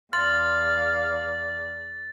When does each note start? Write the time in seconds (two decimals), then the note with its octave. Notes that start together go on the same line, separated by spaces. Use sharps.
0.13 E2 D5 F5 C6 A6